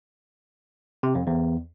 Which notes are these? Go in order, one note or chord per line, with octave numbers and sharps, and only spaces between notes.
C3
F2
E2